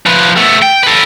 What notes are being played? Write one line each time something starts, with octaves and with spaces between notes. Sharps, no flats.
F3 B4
A3 B3
G5
A4 B4